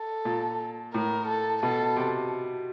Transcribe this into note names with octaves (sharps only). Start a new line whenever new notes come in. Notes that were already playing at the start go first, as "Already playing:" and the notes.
Already playing: A4
A#2
A2 A#4
A4
B2 A4
C3